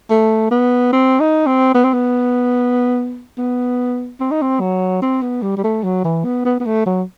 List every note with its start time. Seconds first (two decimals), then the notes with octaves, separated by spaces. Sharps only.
0.10 A3
0.51 B3
0.92 C4
1.20 D#4
1.47 C4
1.75 B3
1.84 C4
1.94 B3
3.38 B3
4.20 C4
4.31 D#4
4.42 C4
4.60 F#3
5.02 C4
5.22 B3
5.43 G3
5.57 G3
5.64 A3
5.84 F#3
6.04 E3
6.24 B3
6.45 B3
6.60 B3
6.66 A3
6.86 F#3